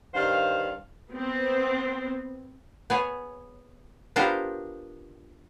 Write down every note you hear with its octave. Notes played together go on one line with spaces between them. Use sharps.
G2 D#3 C5 F5
B3 C4
B3 G#4 C#5
B3 D4 F4 G4 A#4 C5